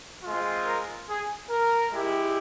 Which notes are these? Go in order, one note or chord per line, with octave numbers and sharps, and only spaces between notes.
G#3 C4 F4
A#4
G#4
A#4
G#3 E4 G4